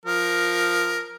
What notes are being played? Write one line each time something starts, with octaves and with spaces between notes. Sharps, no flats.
F3 A#4